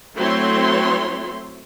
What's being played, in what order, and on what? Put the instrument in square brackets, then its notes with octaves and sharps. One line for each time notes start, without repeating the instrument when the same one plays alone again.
[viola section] F#3 A3 C4 E4 C#5 C6